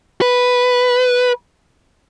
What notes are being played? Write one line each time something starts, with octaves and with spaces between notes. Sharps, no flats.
B4